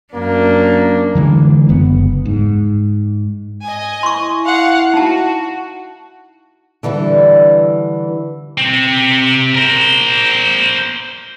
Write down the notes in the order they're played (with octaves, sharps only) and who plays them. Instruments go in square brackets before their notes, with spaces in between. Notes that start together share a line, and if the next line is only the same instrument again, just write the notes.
[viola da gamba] F#2 D4 [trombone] A#3
[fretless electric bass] D3 E3 G#3
F#1 B3
G#2
[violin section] D#5 G#5
[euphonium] E4 [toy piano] C6 C#6
[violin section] F5 F#5
[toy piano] D#4 A5 [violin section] F#4
[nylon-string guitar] D3 E3 G3 D4
[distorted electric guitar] C3 C4
A#4 C5